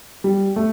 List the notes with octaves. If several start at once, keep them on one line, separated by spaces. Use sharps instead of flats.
G3
A3